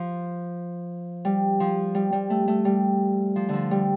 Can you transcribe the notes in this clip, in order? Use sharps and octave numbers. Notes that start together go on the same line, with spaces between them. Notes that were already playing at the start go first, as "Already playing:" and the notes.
Already playing: F3
G3
F3
G3
G3
A3
A3
G3
F3
D3 F3
G3